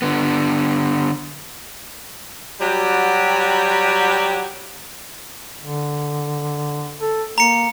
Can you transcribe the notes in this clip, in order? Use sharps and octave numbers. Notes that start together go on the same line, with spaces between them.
D3 B3
F#3 G3 F#4 G4
D3
A4
A#3 A#5 C#7